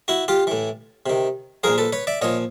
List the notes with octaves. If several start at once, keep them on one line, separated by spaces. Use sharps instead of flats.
E4 F#4
F4 G4
A2 E3
C3 D#3
A#2 F3 G#4 A#4
A4 B4
B4 C#5
D5 E5
A#2 F3 C#5 D#5